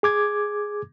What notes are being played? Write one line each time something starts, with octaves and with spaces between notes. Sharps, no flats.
G#4 D6 G#6